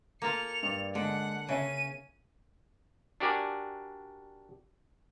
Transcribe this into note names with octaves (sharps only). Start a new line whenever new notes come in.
A#3 F4 A4 C#7 F7
G2 D5
D3 G#3 F#5
C#3 C#4 E5 D#7
D4 F#4 G4 A#4 D5 G#5